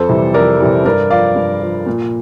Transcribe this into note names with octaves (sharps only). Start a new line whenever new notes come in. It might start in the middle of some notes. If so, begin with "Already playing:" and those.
Already playing: F2 A4 C5
C3 E3 G3
F2 A#4 D5
C3 E3 G3
G2 A#4 D5
F3 D5 F5
G2
F3
A#2